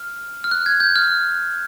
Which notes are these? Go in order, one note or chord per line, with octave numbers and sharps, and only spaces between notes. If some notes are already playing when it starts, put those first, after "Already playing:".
Already playing: F6
F6
F#6
G#6
G6
F6